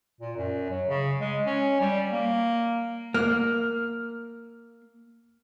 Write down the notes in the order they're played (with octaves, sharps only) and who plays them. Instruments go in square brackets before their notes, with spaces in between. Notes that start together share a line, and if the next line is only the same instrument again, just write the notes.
[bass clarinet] A#2
F#2
F#3
C#3
G#3
C#4
G3
A#3
[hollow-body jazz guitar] A#3 [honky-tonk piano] F6